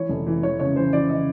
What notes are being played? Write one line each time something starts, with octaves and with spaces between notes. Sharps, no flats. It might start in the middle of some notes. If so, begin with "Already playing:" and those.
Already playing: E3 C#5
F1
E3
E3 C#5
C#3 C#5
E3 C5
E3 D5
C#3 D#5